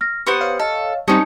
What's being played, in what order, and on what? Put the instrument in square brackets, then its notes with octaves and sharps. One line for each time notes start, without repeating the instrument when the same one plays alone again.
[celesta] F6 A#6
[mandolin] B3 C4 F#5 [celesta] G4 C#7 [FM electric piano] C#6
[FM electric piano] C#5 F5
[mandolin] A4 [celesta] D#5
[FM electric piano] G3 C4 C5 [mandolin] C#4 D#4 [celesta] A5 D#6 C#7